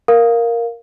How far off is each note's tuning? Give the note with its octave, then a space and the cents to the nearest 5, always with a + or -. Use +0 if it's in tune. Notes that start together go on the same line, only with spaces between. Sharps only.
A#4 +0 F5 +0